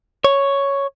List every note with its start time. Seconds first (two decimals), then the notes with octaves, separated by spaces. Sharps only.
0.24 C#5